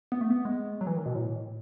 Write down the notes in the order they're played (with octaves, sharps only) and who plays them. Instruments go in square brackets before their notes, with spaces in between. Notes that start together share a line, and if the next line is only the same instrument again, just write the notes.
[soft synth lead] B3
A3
B3
G#3
F#3
E3
D#3
B2
A2